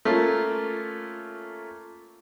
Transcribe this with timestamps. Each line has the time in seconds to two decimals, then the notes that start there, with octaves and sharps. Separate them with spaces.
0.05 A3 A#3 C#4 F4 A#4